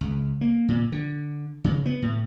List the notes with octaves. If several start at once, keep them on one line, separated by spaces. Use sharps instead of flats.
C#2
A#3
A#2
D3
C#3
B3
A2